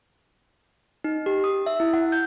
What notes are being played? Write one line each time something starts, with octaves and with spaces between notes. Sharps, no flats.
D#4
G4
D#6
E5
E4
F#5
G6